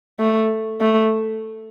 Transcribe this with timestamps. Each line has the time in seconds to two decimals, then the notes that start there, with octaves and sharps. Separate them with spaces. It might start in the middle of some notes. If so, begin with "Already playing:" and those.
0.20 A3
0.81 A3